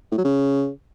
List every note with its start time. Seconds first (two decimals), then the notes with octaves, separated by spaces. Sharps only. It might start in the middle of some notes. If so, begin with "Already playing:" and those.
0.11 A2
0.18 F#3
0.24 C#3